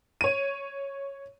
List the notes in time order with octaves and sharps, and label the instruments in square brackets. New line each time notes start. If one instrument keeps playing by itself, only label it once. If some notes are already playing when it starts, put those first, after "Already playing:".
[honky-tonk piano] C#5 D#7